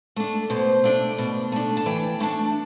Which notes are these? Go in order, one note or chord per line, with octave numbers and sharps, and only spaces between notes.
A3 D4
B2 C5
A3 D4
B2
A3 D4
A5
E3 G5
A3 D4 A5